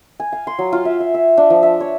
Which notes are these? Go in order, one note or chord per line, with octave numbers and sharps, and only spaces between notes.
G#5
F5
C6
F#3
F4
E5
E5
E5
D4
F3
E5
C#5